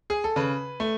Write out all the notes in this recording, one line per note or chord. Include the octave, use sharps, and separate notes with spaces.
G#4
A4
C#3 B4
A3